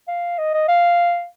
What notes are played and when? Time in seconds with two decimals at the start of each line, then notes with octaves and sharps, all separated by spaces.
0.08 F5
0.38 D#5
0.54 D#5
0.68 F5